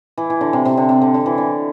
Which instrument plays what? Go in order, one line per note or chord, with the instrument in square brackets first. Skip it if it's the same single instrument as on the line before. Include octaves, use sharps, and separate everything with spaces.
[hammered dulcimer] E3
E3
D3
C3
C3
D3
C3
D3
D3
E3
D3